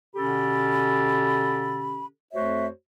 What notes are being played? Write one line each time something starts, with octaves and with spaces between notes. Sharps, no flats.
B2 D3 C#4 G4 A4 B5
F2 A3 F#4 C5 C#5 E5